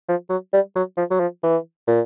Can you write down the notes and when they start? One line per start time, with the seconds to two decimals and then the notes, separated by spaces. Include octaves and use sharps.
0.08 F3
0.30 F#3
0.53 G3
0.76 F#3
0.97 F3
1.10 F#3
1.20 F3
1.43 E3
1.87 A#2